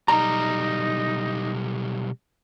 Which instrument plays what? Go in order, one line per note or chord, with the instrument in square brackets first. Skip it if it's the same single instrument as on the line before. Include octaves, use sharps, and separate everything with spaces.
[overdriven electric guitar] B1 G3 [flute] D#4 [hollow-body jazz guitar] A#5